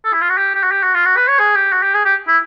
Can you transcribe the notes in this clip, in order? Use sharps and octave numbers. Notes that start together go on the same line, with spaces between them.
A4
E4
F4
F#4
G4
G4
F#4
G4
F#4
F4
F#4
B4
C#5
G#4
G4
F#4
G4
G#4
G4
E4